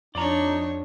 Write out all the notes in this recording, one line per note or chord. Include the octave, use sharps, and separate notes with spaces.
F2 D4 D#4 C#5 D5 A#5